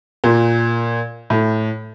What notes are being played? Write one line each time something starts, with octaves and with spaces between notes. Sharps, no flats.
A#2
A2